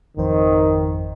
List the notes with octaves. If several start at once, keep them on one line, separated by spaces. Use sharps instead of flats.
G#1 F2 D#3 C5